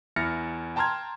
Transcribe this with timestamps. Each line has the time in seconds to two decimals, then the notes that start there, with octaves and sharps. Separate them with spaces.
0.16 E2 E4 F6 A6 A#6 C#7
0.76 G5 A5 A#5 C6 F6 G#6